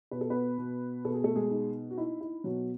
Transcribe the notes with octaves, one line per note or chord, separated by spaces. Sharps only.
B2 B4
A4
B3 B4
B2
B2 A4
G#4
A3 A4
G#3 G#4
D#4
F#4
D#4 E4
E4
B2 F#3 F#4